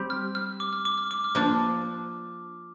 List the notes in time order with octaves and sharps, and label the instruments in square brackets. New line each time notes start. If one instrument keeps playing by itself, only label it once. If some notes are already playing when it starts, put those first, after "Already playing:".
Already playing: [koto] G3 C4 G4
[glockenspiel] F6
F6
D6
F6
D6
F6
D6
F6
[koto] F3 A#3 D4 [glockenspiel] D6